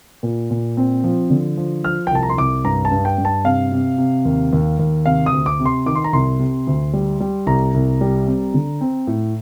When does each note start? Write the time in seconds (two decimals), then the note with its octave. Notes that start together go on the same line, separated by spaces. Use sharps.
0.23 A#2
0.51 A#2
0.77 C4
1.04 F3
1.30 D3
1.57 F3
1.84 F3 F6
2.07 G5
2.11 C2 A5
2.23 A#5
2.30 C6
2.37 C2 D6
2.65 G2 A#5
2.85 A5
2.91 G2
3.05 G5
3.18 G2
3.25 A5
3.44 C3 F5
3.72 C3
3.98 C3
4.25 D#2
4.53 D#2
4.79 D#2
5.06 C3 F5
5.26 D#6
5.33 D2
5.46 D6
5.59 C3
5.66 C6
5.86 D#3 D6
5.95 C6
6.04 A#5
6.13 C2 C6
6.40 C3
6.67 D2
6.93 G3
7.20 G3
7.47 C2 A#5
7.74 C2
8.01 G3
8.27 C4
8.54 D3
8.81 C4
9.07 A2